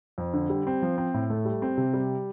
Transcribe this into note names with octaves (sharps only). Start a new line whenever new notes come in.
F2
D3
G3
C4
F3
C4
A2
A3
G3
C4
C3
G3